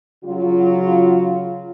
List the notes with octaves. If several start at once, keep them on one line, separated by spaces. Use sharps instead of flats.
C#3 F#3 F4